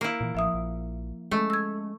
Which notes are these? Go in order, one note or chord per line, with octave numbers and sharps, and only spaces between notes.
A#3 E4
A#2 C#3 E3
A1 F3 E5 D#6
A#1
G#3 A3 C#4
E6 G#6